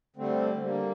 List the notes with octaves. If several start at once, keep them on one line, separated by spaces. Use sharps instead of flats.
D3 G3 A3 C4
D3 G3 A#3